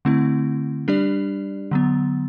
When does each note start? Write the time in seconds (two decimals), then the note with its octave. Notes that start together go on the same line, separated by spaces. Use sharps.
0.05 D3 A3 C4 E4
0.88 G3 D4 G4 D5
1.71 D3 F#3 B3